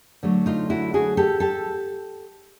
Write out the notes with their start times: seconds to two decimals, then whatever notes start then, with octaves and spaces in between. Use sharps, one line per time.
0.23 D3 F#3 A3
0.46 D#4 F4
0.70 E4 F#4
0.94 F#4 G#4
1.17 G4 A4
1.40 G4 A4